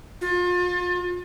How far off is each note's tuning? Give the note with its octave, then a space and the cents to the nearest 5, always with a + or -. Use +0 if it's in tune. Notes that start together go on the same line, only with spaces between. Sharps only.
F4 +35